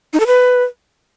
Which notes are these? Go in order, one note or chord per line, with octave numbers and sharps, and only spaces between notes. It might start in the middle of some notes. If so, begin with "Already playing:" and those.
D#4
A4
B4